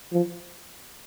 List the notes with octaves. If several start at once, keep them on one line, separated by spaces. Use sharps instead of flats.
F3